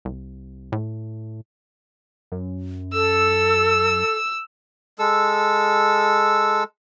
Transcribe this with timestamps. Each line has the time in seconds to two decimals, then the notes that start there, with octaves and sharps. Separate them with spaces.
0.05 C2
0.72 A2
2.32 F#2
2.93 A4 E6
4.99 G#3 A4 E6